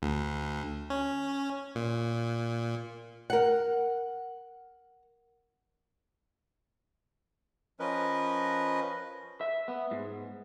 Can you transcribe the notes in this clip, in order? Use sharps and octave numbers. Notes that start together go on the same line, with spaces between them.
D2
C#4
A#2
A#4 F#5
F3 C#4 A#4 B4 D#5
E5
B3
G#2